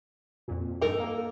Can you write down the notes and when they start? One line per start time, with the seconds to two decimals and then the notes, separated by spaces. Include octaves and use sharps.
0.48 F2 A#2
0.81 G2 D#4 A4 A#4
1.00 A#3